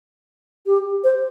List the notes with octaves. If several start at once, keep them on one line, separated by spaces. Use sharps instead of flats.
G4
C5